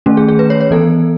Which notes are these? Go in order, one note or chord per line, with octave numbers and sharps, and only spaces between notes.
D#3 A3 C#4
G#4
G#4
B4
C#5
C#5
E3 B3 A4